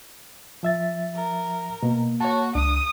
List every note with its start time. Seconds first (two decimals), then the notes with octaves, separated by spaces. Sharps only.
0.63 F3 E5 A6
1.15 A#4
1.83 B2 A#3
2.21 F#4 C#5 A5
2.55 C#2 D4 D#6